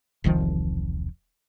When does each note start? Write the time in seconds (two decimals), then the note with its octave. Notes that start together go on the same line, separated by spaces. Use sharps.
0.24 E1 C2 D#3 F3